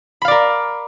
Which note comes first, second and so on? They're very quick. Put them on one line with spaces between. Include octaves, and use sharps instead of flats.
B5 F5 D5 A#4